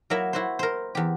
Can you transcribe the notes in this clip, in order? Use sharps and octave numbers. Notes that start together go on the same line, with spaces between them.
F#3 A#3 E4 A#4 E5
E4 F#4 C5
A#4 C5
E2 G4